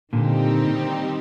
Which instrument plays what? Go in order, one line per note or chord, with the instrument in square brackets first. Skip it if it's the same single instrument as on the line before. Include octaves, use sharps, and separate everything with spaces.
[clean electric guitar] A#2 D3 [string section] D#3 G3 C4 D#4 G4